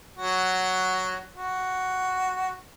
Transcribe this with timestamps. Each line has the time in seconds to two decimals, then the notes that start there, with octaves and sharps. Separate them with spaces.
0.17 F#3 F#4
1.35 F#4